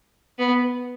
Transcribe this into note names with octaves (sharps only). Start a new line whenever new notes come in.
B3